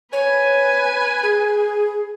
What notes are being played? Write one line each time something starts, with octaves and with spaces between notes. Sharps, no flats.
B4 C#5 G#5
G#4